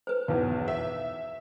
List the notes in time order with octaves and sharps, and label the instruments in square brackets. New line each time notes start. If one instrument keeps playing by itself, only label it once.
[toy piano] B4 C5
[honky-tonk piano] B1 E2
E5